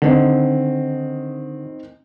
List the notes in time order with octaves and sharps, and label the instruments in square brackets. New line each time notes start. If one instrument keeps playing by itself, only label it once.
[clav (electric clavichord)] D3 [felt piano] D#3 C4 D#5